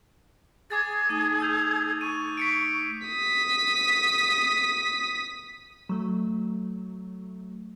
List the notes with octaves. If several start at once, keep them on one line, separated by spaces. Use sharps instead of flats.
G#4 D6 G#6 A6
A3 D#4 D#6 D#7
E6 G6 F7
C#6 D#7
B6 C#7 D7
D#6 B6
F#3 A3